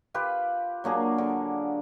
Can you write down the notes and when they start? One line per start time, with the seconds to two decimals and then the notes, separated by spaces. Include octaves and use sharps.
0.14 F4 G4 B4
0.84 F#3 A#3 D4 G#4
1.18 D3